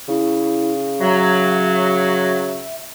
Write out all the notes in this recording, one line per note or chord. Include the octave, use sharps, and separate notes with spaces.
C#3 E4
F#3 E5